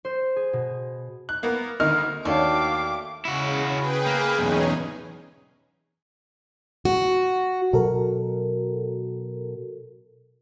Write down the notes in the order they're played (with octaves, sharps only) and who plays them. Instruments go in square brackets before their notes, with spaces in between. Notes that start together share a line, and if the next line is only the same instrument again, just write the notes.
[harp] C5
G#4
B2
[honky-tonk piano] F#6
A#3 B3 A#4
D2 D#3 A#3 D#5 F6
[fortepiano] D#2 D4 C#5 [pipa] A3 [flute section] F#4 F5 G5 [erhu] D6
[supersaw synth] C#3 [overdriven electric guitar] E4 F#4
[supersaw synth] G#4 B4 G5
[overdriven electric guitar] A#3
[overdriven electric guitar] B1 E2 [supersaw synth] C#4 D#4 G#4
[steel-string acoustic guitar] F#4
[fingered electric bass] B2 F#3 [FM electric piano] F#4 A4 A#4